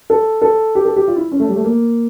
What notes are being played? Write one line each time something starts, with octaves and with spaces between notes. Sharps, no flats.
A4
A4
G4
A4
G4
F4
E4
C#4
A3
G3
A3
A#3